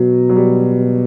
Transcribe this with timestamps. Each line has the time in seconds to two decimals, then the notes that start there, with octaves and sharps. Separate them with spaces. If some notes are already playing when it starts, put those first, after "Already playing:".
Already playing: B2 F#3
0.29 F#3
0.36 G3